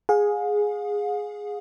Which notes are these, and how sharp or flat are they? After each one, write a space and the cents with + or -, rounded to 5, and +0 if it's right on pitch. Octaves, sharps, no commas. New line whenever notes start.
G#4 +0 F5 +45